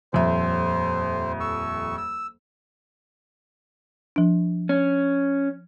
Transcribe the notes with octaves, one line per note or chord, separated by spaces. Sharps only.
D#1 F2 C5 E5
C#6 E6
E6
F3 D4
C#4